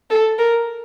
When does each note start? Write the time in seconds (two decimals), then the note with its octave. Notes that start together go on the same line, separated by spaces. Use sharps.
0.10 A4
0.39 A#4